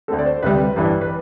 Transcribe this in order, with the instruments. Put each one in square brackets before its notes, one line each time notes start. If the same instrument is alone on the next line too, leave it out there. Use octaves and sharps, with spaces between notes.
[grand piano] D2 D3 A3 C4 A4
D5
C5
D2 C3 G3 B4
A1 G2 E3
B4